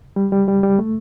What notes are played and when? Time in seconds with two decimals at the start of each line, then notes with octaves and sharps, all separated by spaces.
0.16 G3
0.32 G3
0.48 G3
0.63 G3
0.79 A3